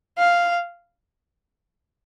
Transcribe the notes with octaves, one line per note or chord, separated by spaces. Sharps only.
F5